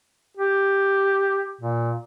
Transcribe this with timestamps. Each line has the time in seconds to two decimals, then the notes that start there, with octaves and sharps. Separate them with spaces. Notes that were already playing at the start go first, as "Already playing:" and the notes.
0.37 G4
1.61 A#2